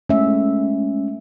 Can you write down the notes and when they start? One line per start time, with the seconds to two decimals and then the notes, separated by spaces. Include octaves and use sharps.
0.09 G#3 A3 C#4 E5